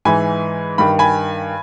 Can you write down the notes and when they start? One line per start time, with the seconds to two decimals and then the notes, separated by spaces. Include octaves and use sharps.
0.05 G#2 E3 G#5 B5
0.78 G2 D#3 B5
0.99 G#5 B5